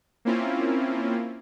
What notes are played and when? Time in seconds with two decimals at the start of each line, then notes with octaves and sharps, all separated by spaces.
0.25 A#3 C4 C#4 E4 F4